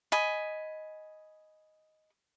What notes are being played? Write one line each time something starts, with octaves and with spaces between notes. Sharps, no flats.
D#5 G#5 B5